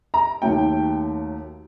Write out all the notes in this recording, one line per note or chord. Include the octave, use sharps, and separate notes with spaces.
A#5
D#2 D#3 F#3 A3 G5